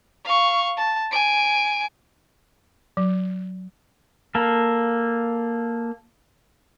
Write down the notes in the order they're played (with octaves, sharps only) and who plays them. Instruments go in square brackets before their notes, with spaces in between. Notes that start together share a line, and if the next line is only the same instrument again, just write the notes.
[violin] F5 C#6
A5
G#5 D7
[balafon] F#3
[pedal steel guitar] A#3 A4